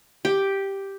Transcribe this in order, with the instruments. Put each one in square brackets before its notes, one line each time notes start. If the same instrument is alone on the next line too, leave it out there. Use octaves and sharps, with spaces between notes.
[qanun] G4